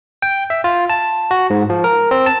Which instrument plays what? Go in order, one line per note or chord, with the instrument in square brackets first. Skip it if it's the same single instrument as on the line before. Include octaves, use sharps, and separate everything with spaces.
[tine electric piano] G5
E5
F4
A5
F#4
G#2
F3
A#4
C4
A5